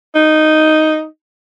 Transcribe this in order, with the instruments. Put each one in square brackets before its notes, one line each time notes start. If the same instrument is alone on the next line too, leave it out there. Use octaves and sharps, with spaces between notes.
[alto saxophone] D#4